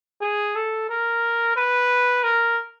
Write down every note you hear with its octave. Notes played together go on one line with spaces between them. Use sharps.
G#4
A4
A#4
B4
A#4